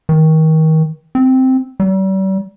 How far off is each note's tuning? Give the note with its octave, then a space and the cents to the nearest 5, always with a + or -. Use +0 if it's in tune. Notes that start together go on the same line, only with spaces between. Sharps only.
D#3 +30
C4 -5
G3 -40